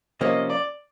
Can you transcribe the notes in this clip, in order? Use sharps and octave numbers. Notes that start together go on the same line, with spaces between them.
C3 F3 A#3 C#4 D#5
D5